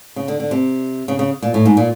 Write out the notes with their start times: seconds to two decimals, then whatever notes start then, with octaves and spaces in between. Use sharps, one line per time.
0.16 C#3
0.28 D3
0.40 D3
0.51 C3
1.08 C#3
1.19 C#3
1.42 A#2
1.54 A2
1.65 G#2
1.77 A#2